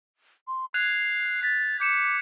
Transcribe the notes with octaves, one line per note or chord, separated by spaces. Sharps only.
C6
F#6 G#6 C7 F7
A6 B6
D6 G6 C#7 E7